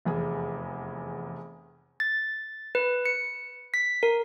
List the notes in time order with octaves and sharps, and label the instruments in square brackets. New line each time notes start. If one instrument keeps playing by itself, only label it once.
[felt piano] F1 E2 G#4
[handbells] A6
B4
C#7
B6
A#4